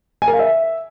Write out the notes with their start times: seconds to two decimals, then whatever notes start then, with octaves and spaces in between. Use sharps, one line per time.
0.22 G#5
0.28 A#4
0.33 F5
0.39 E5